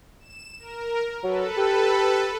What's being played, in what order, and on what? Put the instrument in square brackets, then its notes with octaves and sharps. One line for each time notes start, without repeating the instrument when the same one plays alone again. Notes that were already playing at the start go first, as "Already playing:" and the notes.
[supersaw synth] E7
A#4
[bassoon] F#3 [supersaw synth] A4 B4
[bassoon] G4